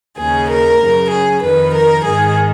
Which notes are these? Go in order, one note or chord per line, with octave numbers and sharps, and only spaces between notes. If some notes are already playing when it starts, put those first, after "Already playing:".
D#2 C#3 G#4
A#4
F#2 C#3
G#4
F2 D#3 B4
A#4
G#2 D#3 G#4